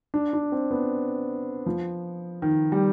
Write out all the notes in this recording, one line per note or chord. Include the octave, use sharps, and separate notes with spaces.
D4
D4
C4
B3
F3
D#3
G3